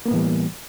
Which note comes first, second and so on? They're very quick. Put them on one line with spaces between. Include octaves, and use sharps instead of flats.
A#3 B3 A2 E3 G3